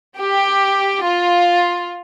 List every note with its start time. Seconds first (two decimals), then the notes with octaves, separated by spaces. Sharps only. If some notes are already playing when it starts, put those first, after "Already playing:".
0.18 G4
1.02 F4